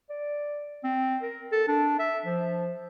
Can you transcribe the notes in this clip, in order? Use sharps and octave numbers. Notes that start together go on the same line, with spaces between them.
D5
C4
A#4
A4
D4
E5
F3